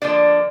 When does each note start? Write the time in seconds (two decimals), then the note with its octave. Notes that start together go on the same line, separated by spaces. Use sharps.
0.02 D3 F3 A#3 D4 D5